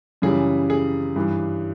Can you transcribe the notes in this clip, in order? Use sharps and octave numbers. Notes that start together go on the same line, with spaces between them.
F#2 C#3 E3 G3 G#4
G#4
G2 E3 G3